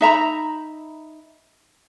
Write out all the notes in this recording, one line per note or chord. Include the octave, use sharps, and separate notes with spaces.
D#4 E5 A#5 B5